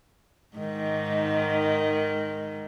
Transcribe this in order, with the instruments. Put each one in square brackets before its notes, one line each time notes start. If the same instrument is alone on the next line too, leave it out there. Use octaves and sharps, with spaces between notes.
[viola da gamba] G#2 D#3